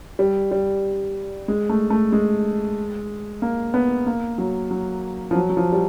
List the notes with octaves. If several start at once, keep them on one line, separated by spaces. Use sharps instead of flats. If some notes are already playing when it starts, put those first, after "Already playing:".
G3
G3
G#3
A3
A3
G#3
A#3
B3
A#3
F#3
F#3
F3
F#3
F#3
F3
G3